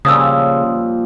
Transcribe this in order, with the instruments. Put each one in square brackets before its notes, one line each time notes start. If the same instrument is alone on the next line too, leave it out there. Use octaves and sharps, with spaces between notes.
[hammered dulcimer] A#2 F3 G3 [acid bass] C#3 [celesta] D#6 E6